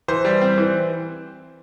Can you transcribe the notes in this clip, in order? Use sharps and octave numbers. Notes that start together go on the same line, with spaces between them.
E3 C5
G3
C4
E3